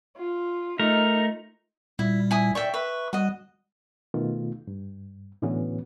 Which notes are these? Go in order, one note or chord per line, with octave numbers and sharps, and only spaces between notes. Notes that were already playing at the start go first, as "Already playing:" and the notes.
F4
A3 D#4 A#4
A#2 G3 E4
E4 G#5 D#6
D5 E5 G5 C#6
B4 E5 C#6
G3 F#4 D#5
B2 D#3 A3 F4
G2
A2 D3 E3 B3 C#4 F#4